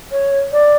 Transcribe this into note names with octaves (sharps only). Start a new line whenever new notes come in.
C#5
D5